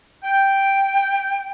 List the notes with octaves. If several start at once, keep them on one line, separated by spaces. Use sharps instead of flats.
G5